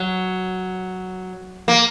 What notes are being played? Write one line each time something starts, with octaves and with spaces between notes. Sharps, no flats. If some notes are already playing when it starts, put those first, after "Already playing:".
Already playing: F#3
A#3